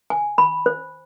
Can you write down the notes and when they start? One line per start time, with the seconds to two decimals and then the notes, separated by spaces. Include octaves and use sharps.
0.10 G#5
0.38 B5
0.66 C5